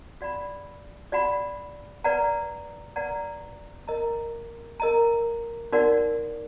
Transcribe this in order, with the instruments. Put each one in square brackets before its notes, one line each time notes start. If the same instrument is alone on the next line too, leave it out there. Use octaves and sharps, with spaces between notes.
[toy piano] F#4 D5 F#5 B5
F#4 D5 F#5 B5
B4 D5 F#5 A#5
B4 D5 F#5 A#5
A#4 D#5 A#5
A#4 D#5 A#5
D#4 F#4 A#4 D5 F#5